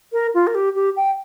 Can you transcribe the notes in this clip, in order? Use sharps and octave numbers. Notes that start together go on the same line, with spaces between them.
A#4
F4
A#4
G4
G4
G5